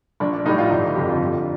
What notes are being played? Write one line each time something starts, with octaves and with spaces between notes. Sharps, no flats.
A#1 D4
D4
A2 G3 D#4
F4
G1 D#4
F2 D3 G4
F4
G1